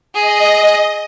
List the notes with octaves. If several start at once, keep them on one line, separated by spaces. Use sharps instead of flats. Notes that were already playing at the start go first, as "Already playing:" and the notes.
G#4 D#5